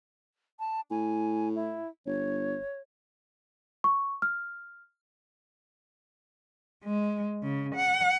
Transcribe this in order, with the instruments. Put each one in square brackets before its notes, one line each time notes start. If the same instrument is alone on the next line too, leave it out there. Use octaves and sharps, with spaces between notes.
[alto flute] A5
[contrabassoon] A2 [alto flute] G#5
[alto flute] E4
[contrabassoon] G1 [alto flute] C#5
[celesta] C#6
F6
[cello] G#3
C#3
F#5